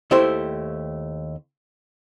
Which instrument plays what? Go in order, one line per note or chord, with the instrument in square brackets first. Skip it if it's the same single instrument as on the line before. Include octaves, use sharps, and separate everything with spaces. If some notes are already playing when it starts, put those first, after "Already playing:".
[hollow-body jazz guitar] D#2 A3 E4 G4 C5